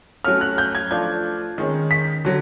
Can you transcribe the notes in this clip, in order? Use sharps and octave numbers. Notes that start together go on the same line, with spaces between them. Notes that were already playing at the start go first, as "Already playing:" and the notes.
F#3 A3 C#4 F6
F#6
G6
G#6
F3 A3 D4 F4 G#6
D#3 G#3 C#4
B6
D3 F#3